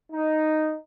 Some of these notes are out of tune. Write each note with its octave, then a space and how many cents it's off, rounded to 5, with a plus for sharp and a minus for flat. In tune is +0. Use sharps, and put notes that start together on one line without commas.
D#4 -5